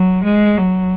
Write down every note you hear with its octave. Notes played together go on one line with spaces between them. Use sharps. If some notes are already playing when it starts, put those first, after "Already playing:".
Already playing: F#3
G#3
F#3